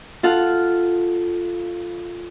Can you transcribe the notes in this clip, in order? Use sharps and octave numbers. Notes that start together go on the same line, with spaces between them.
F4 A4 F#5 F6